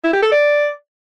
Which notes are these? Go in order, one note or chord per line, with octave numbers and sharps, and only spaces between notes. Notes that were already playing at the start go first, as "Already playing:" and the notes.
E4
G4
A4
D5